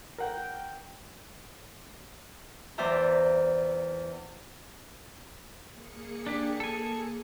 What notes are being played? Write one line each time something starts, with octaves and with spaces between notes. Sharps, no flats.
A#4 F#5 G5
E2 C5 D5 E5 G5 A#5
A#3 G#4 C#7
D4 G4
A4 G#5